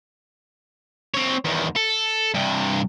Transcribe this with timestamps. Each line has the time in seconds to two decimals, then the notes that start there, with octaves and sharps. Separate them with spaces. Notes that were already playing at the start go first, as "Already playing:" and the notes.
1.14 C4 C#5
1.45 E2 D#3
1.76 A4
2.34 G2 C3